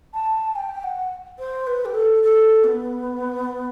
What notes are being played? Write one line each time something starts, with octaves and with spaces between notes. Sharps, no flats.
A5
G5
F#5
C5
B4
G4
A4
A4
B3